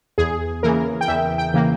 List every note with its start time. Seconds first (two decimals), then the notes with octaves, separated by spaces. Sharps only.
0.18 E2 G#4
0.63 C#3 E3 A#3 A#4
1.01 G5
1.08 E2 E5
1.38 G5
1.54 C#3 E3 A#3